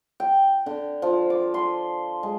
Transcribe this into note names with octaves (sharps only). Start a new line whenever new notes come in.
G5
D3
F3
D6
C6
G#3